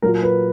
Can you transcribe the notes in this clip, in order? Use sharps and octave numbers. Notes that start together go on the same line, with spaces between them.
A#2 F#3 A#4
B4